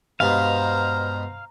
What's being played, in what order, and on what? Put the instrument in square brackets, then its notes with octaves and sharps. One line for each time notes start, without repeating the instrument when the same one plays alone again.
[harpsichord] G2 B2 G#3 [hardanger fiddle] C5 A#5 [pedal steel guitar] F5